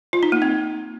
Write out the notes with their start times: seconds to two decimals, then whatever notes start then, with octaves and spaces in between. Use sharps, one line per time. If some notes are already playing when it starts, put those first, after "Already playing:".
0.13 F4
0.23 D#4
0.32 A#3
0.42 C4